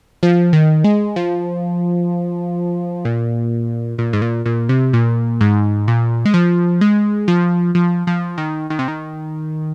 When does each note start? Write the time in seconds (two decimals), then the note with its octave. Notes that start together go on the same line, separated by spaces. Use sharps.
0.23 F3
0.53 D#3
0.84 G#3
1.16 F3
3.05 A#2
3.98 A#2
4.13 G#2
4.22 A#2
4.46 A#2
4.69 C3
4.93 A#2
5.41 G#2
5.88 A#2
6.25 G#3
6.34 F3
6.81 G#3
7.28 F3
7.75 F3
8.07 F3
8.38 D#3
8.70 D#3
8.79 C3
8.88 D#3